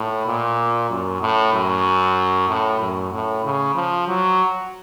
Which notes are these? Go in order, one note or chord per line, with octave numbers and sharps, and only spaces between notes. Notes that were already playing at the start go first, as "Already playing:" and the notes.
Already playing: A2
A#2
F#2
A2
F#2
A2
F#2
A2
C#3
F3
F#3